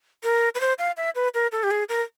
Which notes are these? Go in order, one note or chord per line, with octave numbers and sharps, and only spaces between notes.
A#4
B4
C5
F5
E5
B4
A#4
A4
G4
G#4
A#4